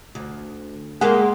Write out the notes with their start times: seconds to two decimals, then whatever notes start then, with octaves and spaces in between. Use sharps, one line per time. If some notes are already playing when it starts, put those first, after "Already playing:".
0.15 D2
1.01 G#3 A#3 G4 G#4 F#5